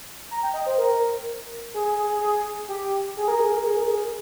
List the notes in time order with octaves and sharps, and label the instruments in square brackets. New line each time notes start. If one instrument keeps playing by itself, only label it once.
[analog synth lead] A#5
G5
D#5
C5
A#4
G#4
G#4
G#4
G#4
G#4
G4
G#4
A#4
G#4
A#4
G#4
A#4
G#4